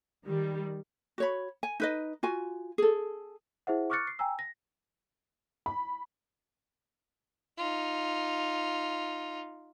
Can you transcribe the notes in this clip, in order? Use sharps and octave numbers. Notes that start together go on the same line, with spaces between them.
D#3 G3
F#4 C#5 B5
G#5
D#4 B4 D#5
F4 F#4 G#5
G#4 A4
E4 G#4 C5 E5 F#5
C#6 D6 F6 F#6 A6 C#7
C7
G5 G#5 A#5 E6
A#6
B5
D#4 F4